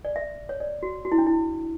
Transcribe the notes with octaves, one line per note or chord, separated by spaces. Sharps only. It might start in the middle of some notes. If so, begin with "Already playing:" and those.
D5
E5
C#5
D5
F#4
F#4
E4
D4
E4